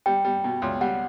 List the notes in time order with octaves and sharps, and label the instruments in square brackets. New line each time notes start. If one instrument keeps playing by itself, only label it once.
[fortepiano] G3 [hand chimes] G5
[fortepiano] G3
B2
C#2
[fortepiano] G3 [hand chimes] F#5